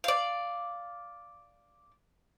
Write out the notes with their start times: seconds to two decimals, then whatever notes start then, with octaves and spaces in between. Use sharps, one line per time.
0.04 D5 F5